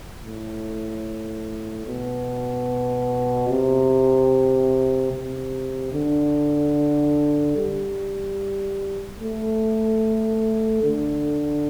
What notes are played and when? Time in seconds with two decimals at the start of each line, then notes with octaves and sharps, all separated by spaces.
0.22 A2
1.86 B2
3.49 C3
5.12 C3
5.93 D3
7.57 G3
9.20 A3
10.83 D3